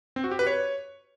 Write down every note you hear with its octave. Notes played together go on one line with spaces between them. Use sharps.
C4
F#4
G4
B4
C#5